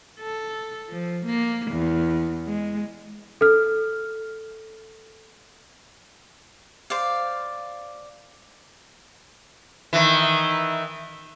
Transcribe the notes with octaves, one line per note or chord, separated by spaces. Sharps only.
A4
F3
A#3
E2
G#3
A4 F6
C5 D5 F5
D#3 E3